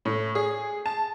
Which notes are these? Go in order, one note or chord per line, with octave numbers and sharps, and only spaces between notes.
A2
G#4
A5